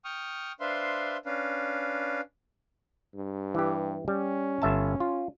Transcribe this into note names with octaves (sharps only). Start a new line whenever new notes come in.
G5 C#6 D#6 F6
D4 B4 C5 E5 F5 C6
C#4 D4 B4 F5
G2
E3 G4
G3 C#4
G1 E5 A5
F4